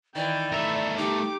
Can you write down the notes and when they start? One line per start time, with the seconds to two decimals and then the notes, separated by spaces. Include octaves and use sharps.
0.15 D#3 E3 D5 G5
0.53 A3 A#4 E5
0.97 D#4 G4 D6